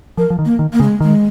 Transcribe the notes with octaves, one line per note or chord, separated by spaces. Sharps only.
F3 A#4
F3
D#3
A#3
D#3
A#3
C#3
G#3
D#3 G#3